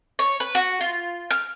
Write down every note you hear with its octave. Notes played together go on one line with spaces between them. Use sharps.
C#5
B4
F#4
F4
F6